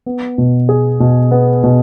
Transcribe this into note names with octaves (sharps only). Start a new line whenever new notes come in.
B3
B2
G#4
B2
B3
B2